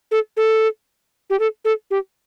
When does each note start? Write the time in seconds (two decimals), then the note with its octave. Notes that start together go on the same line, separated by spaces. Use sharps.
0.11 A4
0.37 A4
1.30 G4
1.39 A4
1.65 A4
1.91 G4